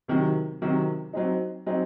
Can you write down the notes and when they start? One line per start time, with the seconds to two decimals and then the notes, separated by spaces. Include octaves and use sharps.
0.08 C3 D#3 F#3
0.62 C3 D#3 F#3
1.13 F#3 C4 D#4
1.66 F#3 C4 D#4